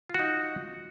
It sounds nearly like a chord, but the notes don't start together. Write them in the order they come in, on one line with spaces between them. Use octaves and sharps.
F4 F#4 D#4